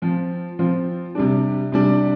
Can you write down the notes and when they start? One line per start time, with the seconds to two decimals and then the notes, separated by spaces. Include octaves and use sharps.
0.02 F3 C4 F4
0.59 F3 C4 F4
1.15 C3 G3 D4
1.72 C3 G3 D4